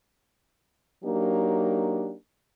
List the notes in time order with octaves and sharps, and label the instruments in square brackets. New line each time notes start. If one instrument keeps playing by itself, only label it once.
[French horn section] F#3 A#3 D4 D#4 G4